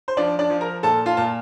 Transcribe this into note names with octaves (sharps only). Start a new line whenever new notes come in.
C5
F3 D4 D5
D4 D5
F3
A#4 A#5
A#2 A4 A5
F4 F5
A#2 A5